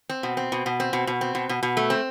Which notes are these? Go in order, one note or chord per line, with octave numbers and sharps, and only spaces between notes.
C4
B2
C4
B2
B2
C4
B2
B2
C4
B2
B2
B2
A3
C4